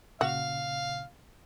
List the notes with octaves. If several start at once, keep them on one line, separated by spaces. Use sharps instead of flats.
A#2 C#3 F#4 F5